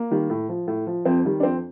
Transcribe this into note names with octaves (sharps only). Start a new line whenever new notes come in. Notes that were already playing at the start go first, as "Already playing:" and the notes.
Already playing: A#3
D#3 G3
A2
F3
A2
F3
F2 C4
D#3 G3
D4
F2 C4